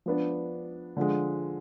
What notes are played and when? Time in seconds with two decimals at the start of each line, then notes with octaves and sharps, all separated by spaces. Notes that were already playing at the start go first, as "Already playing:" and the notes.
0.06 F3 B3 D4
0.97 D3 F3 G#3